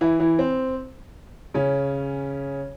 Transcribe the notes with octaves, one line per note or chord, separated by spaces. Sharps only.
E3 E4
E3 E4
C4
C#3 C#4